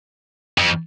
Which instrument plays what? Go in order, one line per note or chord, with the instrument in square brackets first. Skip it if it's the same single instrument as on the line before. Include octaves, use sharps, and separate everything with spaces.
[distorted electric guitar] F2